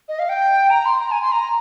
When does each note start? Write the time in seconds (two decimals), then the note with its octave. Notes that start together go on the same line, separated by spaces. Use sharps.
0.09 D#5
0.19 F5
0.29 G5
0.70 A#5
0.86 C6
1.01 A#5
1.12 G#5
1.22 C6
1.32 A#5